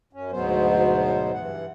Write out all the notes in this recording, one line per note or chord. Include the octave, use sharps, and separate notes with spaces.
F#2 C#4
D2 G#2 B2 F#3 B3 C5
G2 E3 F#5